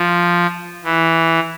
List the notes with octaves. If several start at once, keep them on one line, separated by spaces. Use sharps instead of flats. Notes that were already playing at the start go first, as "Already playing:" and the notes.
Already playing: F3
E3